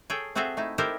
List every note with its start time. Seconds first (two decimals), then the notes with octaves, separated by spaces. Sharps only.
0.10 G#4 A4 C#5 G5
0.35 C4 F#4 G#4 A4 C5 E5
0.57 A3 D#4 E4
0.78 D#4 E4 G4 A4 A#4 C5